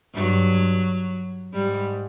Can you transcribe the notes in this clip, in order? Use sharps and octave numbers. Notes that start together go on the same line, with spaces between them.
G2 F#3
G#2 G3